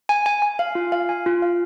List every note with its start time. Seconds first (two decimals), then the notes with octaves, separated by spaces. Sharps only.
0.09 G#5
0.26 G#5
0.42 G#5
0.59 F5
0.75 F4
0.92 F5
1.09 G#5
1.26 F4
1.42 F5